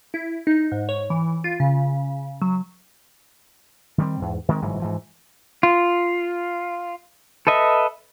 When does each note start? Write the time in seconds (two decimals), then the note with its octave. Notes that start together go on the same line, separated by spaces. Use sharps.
0.14 E4
0.47 D#4
0.72 G#2
0.89 C#5
1.10 E3
1.44 F4
1.60 C#3
2.42 F#3
3.98 D#3 G3 C4
4.20 E2 G#2
4.48 D#3 G#3 C4
4.61 G1 G#2 E3 F#3
4.80 G#2 E3 F3
5.63 F4
7.47 A4 B4 D#5 E5